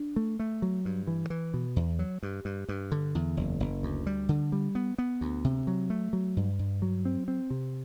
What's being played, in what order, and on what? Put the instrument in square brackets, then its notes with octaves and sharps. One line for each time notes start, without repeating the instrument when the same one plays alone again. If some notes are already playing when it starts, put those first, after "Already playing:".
Already playing: [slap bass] D4
A3
A3
F#3
G2
E3
E3
B2
E2
F#3
G2
G2
G2
D3
E2
F#1
F#1
D2
G3
D3
G3
B3
B3
D2
C3
F#3
A3
F#3
G2
G2
F#3
C4
C4
C3